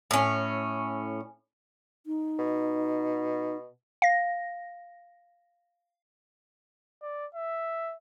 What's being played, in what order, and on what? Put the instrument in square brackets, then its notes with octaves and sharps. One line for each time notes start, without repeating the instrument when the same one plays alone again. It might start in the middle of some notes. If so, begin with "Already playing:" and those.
[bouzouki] A2 C#4
[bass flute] D#4
[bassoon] B2
[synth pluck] F5 A#6
[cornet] D5
E5